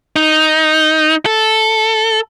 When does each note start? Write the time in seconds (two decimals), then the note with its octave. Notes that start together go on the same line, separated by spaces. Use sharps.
0.16 D#4
1.26 A4